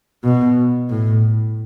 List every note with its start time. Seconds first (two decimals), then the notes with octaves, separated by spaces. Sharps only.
0.24 B2
0.90 A2